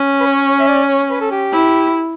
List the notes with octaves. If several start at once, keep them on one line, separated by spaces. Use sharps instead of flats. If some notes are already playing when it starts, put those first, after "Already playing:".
Already playing: C#4
B4
C#5
E5
D5
C#5
B4
A4
G4
E4